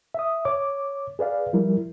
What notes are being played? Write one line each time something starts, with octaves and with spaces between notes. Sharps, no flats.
E5 D#6
C#5 D6
G#4 B4 D5 F5
F3 G3 E4 A#4